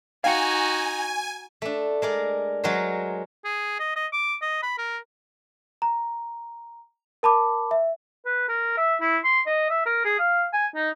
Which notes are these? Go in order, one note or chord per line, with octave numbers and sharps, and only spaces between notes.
D#4 F#4 F5 G5 G#5 C#7
A3 D4
G#3 A#4 D5
F#3 G#3 F#4 A#4 C5
G#4
D#5
D#5
D6
D#5
B5
A#4
A#5
A#4 A5 B5 D6
E5
B4
A#4
E5
E4
C6
D#5
E5
A#4
G#4
F5
G#5
D#4